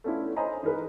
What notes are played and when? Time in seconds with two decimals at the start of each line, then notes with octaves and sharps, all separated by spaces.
0.04 A3 B3 C#4 D4 E4 F4
0.36 C5 C#5 D#5 G#5 A#5 B5
0.63 E3 D#4 G#4 A#4 B4